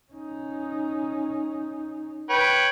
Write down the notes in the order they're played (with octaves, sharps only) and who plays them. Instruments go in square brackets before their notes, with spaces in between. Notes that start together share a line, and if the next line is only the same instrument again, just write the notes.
[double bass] C#4 D#4
[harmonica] B4 C#5 G5